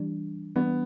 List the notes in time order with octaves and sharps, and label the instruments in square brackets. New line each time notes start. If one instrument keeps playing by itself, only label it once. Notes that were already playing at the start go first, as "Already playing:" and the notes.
Already playing: [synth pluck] E3 G3 D4
[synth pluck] E3 G3 D4 [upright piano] B3